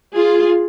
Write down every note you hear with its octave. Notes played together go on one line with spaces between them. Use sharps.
F4 G#4